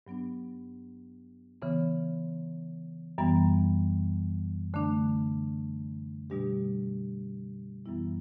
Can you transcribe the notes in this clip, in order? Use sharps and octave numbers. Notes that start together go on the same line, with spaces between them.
G2 F#3 B3 D4
C#3 E3 B3
F#2 E3 G3 B3
D3 A3 D4
B2 G3 D4 G4
F#2 E3 G3 B3 E4